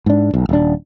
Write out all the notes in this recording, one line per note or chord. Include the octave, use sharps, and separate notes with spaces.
G#2 D4
B1
D#1 D4